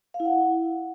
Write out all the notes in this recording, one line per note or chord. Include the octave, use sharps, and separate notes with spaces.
F5
E4
F#5